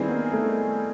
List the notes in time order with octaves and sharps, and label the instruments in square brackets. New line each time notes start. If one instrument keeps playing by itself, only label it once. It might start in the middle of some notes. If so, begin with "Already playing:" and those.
Already playing: [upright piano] D#3 G3 C4 E4 G#4 [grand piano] B3 B4
[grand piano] A#3 A#4
A3 A4